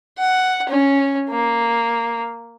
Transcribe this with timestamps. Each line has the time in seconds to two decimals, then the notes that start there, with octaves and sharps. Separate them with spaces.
0.19 F#5
0.69 C#4
1.30 A#3